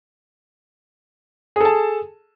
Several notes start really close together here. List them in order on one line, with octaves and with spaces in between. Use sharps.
G#4 A4 A5